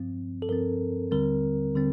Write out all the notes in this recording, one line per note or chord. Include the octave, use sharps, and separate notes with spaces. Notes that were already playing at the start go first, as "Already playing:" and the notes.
Already playing: G2 F3 C4
A4
G2 F3 C4 A#4
D#2 D3 G3 C4 A#4
D3 G3 C4